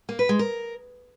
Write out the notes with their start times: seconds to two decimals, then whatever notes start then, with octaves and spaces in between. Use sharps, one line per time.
0.09 A#3
0.19 B4
0.29 G#3
0.39 A#4